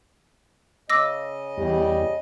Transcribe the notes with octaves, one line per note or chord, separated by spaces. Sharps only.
C#3 D#5 D6 E6 A#6
E2 G3